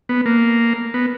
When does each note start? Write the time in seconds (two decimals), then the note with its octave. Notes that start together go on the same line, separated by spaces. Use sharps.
0.09 B3
0.26 A#3
0.94 B3